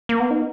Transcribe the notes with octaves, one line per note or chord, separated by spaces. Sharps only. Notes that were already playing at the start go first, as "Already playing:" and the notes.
A#3
B3
D#4